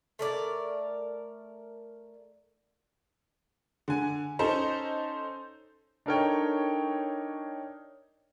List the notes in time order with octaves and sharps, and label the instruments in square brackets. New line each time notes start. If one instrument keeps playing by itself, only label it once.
[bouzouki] A3 A#4 D5
[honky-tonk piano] D3 G#5
C#4 D#4 A4 C5
[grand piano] D4 D#4 A4 A#4 C#5 G5